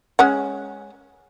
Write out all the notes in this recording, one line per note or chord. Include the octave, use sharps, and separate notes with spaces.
G#3 C#4 F#5